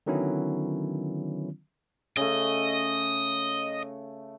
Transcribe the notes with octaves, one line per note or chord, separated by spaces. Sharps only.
D3 D#3 F#3 B3 C#4 E4
C#3 A3 D#5